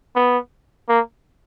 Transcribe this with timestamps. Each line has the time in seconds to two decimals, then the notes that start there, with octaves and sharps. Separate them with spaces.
0.15 B3
0.89 A#3